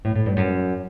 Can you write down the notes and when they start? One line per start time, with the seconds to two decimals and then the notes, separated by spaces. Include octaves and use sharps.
0.05 A2
0.15 A2
0.26 G2
0.37 F#2